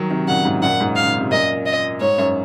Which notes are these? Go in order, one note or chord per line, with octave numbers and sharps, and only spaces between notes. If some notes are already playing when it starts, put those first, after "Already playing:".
Already playing: D#3 F#3
C3 D#3
C3
A#2 C#3 F#5
G#2 C3
F#2 A#2 F#5
G#2
F5
C#3
C3
F#2 A#2 D#5
D#5
G#2 C#5
F#2